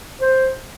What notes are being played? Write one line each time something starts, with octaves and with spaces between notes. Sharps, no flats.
C5